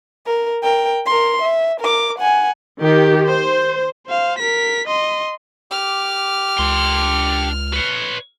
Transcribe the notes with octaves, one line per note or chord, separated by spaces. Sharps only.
A#4
A#4 G5
A#4 C6
E5
A#4 D6
F#5 G#5
D#3 G4
C5
C5 F5
A#4 B6
D#5 C6
G4 D6 F6
C#2 D4 C6
B4 C#5